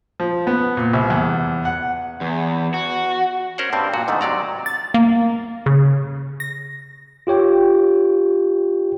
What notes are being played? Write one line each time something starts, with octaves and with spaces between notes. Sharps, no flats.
F3
B3
A#2
C2
E2
F#5
E2
F#4
C#4 A#4 C5 C#5 F#5
G2 G3 C4
A#2 F#4
G#2 D3 D#3 A3
C3 F#3 D5 A#5
A6
A#3
C#3
A#6
F4 G4 C#5 G5